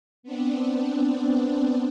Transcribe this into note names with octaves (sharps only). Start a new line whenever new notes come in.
B3 C4 D4